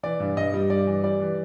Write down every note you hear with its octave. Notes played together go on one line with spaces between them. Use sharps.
E3 D5
G2
G2 D#5
G3
G2 D5
E3
G3 D5
E3